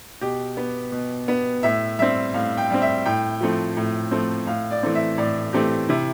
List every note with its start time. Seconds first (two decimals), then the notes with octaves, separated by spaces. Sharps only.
0.21 B2 G4
0.57 B3
0.92 B2
1.28 B3
1.63 A2 E5
1.99 G3 C4 E5
2.34 A2 F5
2.57 G5
2.70 G3 C4
2.82 E5
3.06 A2 G5
3.41 F3 A3 C4
3.77 A2
4.11 F3 A3 C4
4.47 A2 F5
4.71 D5
4.83 E3 A3 C4
4.95 E5
5.18 A2 D5
5.53 E3 A3 C4 G4
5.89 C3 E4